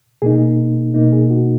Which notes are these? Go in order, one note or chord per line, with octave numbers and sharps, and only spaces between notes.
B2 A#3 D#4 G#4
B2 A#3 D#4
G#4
F#4